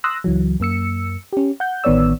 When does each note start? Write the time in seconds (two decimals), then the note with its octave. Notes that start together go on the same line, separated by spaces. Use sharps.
0.04 C6 D#6 E6 F#6 A#6
0.24 C#2 E3 F#3
0.60 F#2 A#3 E6 C#7
1.33 C#4 G4
1.60 F#5 G6
1.84 A1 D#3 B3 C#5 D5 E6